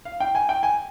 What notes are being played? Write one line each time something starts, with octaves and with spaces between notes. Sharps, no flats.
F5
G5
G#5
G5
G#5